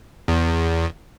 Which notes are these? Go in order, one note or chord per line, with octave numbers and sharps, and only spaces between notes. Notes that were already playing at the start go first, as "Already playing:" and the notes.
E2